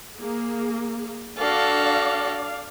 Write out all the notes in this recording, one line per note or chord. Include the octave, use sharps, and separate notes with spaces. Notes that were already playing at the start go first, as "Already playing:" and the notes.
A#3 G#4
D4 F#4 A4 D5 F5